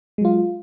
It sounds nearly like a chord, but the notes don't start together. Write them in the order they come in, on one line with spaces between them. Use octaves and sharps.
G#3 F#3 F4